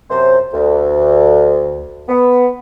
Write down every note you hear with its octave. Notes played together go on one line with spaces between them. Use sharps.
F#2 C3 C5
D2
B3